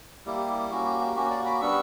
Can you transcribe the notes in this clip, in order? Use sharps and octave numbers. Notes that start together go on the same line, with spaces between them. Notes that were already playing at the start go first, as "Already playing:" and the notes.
G3 A#3 E4 G4
A#3 C#4 F#4
G4
G4
A#3 C#4 F#4 G4
D5 F#5
B5 D6
G3 B3 D4 C#6 E6